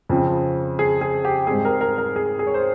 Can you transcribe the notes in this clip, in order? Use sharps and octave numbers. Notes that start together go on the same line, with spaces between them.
F2 C#3 F3 C4
G#4
G#4
G4
G#2 G3 C4 G#4
A#4
A#4
A#4
G#4
G#4
C#5
C5